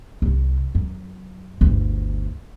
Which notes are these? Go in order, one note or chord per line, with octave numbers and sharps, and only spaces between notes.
C2 F#3
F#2
G1 D2